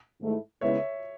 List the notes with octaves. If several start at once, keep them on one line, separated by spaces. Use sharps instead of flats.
G#2 D#3 A3 E4
C#3 G#3 B3 E4 B4 C#5 E5